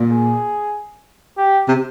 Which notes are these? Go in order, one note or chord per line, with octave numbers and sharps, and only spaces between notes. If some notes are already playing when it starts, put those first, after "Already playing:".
Already playing: A#2
G#4
G4
C3